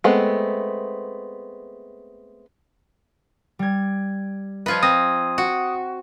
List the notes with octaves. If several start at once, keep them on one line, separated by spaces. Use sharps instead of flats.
G#3 A3 B3 C4
G3 G#6
F3 F4 B4 D#5 G#6
C4 D#6 A#6
F#4